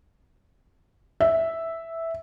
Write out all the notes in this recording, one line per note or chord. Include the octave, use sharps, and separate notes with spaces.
E5